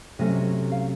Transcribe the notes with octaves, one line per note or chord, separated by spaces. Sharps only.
C3 F#3 A3 C#4 D#5
F5